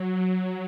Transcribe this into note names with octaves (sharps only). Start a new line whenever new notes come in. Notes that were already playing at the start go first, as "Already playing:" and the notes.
Already playing: F#3
F#3